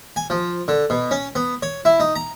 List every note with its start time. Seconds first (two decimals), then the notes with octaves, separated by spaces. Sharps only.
0.16 G#5
0.30 F3
0.68 D3
0.90 B2
1.11 C#4
1.35 B3
1.62 C#5
1.85 E4
2.00 D#4
2.16 A#5